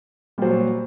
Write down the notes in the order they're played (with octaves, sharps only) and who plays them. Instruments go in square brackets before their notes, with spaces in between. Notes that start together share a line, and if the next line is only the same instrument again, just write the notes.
[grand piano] A#2 F#3 [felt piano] G3 C5